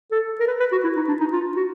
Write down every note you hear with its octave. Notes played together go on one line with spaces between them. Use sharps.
A4
A#4
B4
B4
F#4
E4
D#4
D4
D#4
F4
F#4